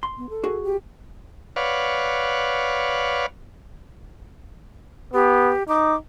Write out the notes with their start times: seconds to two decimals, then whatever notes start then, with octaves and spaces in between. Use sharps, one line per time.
0.03 C6
0.18 B3
0.29 A4
0.44 F#4 G#4
0.64 G4
1.56 B4 C#5 D5 F5 F#5
5.14 B3 G4
5.68 D#4 D6